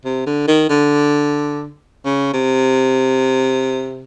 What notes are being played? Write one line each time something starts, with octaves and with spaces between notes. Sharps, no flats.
C3
D3
D#3
D3
C#3
C3